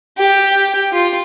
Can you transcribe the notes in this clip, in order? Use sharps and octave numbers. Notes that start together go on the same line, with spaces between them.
G4
F4